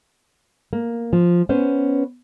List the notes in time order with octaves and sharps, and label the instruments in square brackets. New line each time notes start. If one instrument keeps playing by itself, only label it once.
[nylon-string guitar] A#3
F3
B3 C#4 B4 C5